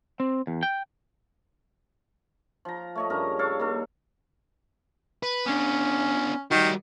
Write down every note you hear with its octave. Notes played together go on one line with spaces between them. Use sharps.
C4
E2
G5
F3 A#5
A3 C#5 D#5
G2 C#3 A#4 A#5
A4 C#5 F5
A#3 D#4 A4
B4
B3 C#4 D4
D#3 G3 F#4